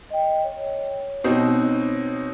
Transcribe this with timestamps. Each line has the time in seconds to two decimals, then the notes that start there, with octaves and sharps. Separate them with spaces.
0.10 D#5 G5
0.44 C#5
1.24 B2 C4 D#4